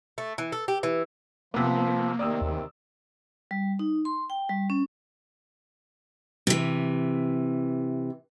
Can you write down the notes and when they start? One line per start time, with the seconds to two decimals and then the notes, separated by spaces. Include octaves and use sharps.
0.18 A3
0.38 E3
0.52 A4
0.68 G4
0.83 E3
1.54 C3 F3 A#3 B3
2.19 C3 D#3 C4 D5 D#6 E6
2.41 D#2
3.51 G3
3.79 D#4
4.05 C6
4.30 G5
4.49 G3
4.70 C#4
6.47 C3 E3